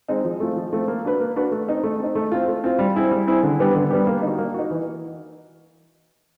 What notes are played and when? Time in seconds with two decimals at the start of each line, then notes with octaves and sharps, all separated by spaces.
0.09 G#3 C4 D#4
0.25 F3
0.40 A3 C4 F4
0.56 F3
0.72 A3 C4 F4
0.88 A#3
1.05 D4 F#4 B4
1.20 A#3
1.36 D4 F#4 B4
1.51 A3
1.68 C4 D#4
1.83 A3
2.00 C4 D#4
2.15 A3
2.32 C4 F4
2.48 A3
2.64 C4 F4
2.79 G3
2.95 C4 E4 G#4
3.11 G3
3.27 C4 E4 G#4
3.43 D3
3.59 G3 B3 D4 G4
3.75 D3
3.91 G3 B3 D4 G4
4.07 A#3
4.22 D#4
4.27 F#4
4.38 A#3
4.54 D#4 F#4
4.70 E3